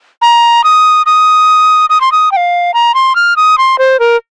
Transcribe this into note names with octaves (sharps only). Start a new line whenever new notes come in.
A#5
D#6
D#6
D#6
C6
D#6
G5
F5
A#5
C6
F6
D#6
C6
C5
A#4